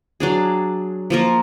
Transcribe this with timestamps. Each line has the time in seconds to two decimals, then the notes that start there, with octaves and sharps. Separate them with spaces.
0.20 F#3 D4 G#4
1.10 F3 A#3 F4 A#4